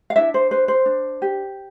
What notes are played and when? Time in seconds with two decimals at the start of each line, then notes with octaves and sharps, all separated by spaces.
0.10 F5
0.16 D4 E4 E5
0.34 C5
0.51 B4 C5
0.68 C5
0.86 D4
1.22 G4